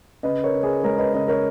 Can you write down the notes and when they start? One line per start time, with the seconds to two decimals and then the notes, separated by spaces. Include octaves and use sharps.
0.23 C#3 B4 D#5
0.44 A#4 C#5
0.54 C#3
0.63 G#4 B4
0.83 G#3 A#4 C#5
0.98 B4 D#5
1.14 C#3 B4 D#5
1.28 A#4 C#5